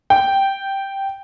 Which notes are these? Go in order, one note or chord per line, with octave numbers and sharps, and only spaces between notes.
G5